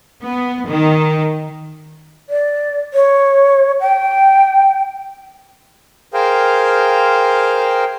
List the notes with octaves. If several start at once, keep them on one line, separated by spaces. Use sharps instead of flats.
B3
D#3
D5
C#5
G5
G#4 A#4 C5 F5 G5